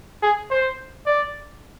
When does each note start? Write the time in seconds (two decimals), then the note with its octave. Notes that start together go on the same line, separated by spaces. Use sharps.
0.22 G#4
0.51 C5
1.07 D5